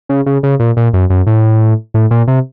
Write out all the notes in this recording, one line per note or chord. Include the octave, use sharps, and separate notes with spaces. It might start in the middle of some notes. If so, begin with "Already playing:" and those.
C#3
C#3
C#3
A#2
A#2
F#2
F#2
A2
A2
A#2
C3